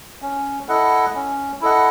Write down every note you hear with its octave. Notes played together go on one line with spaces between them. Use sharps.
C#4
E4 A4 D#5 F#5
C#4
E4 A4 D#5 F#5